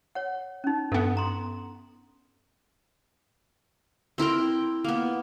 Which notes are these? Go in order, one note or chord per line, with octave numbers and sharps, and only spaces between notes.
C#5 F#5
C#4 D#4
G2 B3 A4
A#5 C6
C4 E4 A#4 G5
A#3 B3